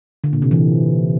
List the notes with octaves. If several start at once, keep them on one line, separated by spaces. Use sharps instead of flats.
D3
A#2
C3
E3